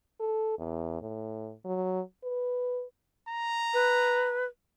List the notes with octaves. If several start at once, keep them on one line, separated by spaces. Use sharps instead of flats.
A4
E2
A2
F#3
B4
A#5
B4